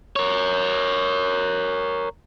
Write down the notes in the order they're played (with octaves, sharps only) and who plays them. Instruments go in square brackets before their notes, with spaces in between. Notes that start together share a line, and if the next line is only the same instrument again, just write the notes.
[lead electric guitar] A#4 C#5